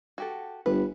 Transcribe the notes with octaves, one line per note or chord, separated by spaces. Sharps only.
F#4 G4 A4
G1 B4